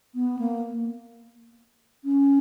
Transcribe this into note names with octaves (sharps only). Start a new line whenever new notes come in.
B3
A#3
C#4